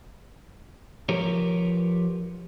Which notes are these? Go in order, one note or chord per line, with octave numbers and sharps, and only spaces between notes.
F3 G4 A#4 B4 C#5